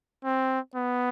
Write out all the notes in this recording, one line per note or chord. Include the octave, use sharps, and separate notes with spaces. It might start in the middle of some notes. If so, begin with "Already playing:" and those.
C4
B3